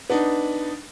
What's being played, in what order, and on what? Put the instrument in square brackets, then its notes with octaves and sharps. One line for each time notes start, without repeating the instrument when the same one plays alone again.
[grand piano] B3 D4 D#4